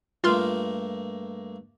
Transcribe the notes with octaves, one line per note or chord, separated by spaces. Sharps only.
G2 A3 A#3 F4 C6 F6